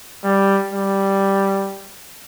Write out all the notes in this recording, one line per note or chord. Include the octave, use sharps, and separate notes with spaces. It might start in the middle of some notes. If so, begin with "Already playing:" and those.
G3
G3